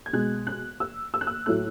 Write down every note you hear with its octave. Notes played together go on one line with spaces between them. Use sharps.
G#6
B2 G#3 F#6
F#6
E6
E6
F#6
E6
A2 F#3 A3 F#6